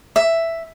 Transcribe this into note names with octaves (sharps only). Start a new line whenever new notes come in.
E5